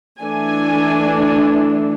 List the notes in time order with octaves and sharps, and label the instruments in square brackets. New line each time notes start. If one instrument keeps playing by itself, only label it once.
[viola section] E3 A3 D4 G#5